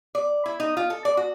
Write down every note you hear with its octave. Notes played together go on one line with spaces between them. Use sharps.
D5
E4
D#4
F4
A4
D5
F#4